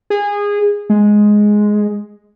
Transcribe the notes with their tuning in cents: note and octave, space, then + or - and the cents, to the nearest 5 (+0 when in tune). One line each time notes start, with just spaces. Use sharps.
G#4 -20
G#3 +5